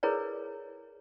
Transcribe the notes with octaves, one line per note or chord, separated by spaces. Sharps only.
E4 G#4 A#4 B4 C#5 D5